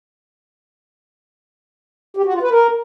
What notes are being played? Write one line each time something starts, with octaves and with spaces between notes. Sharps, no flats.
G4
F#4
F4
B4
A#4